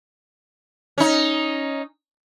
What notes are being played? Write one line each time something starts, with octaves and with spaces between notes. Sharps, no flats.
C#4 D#4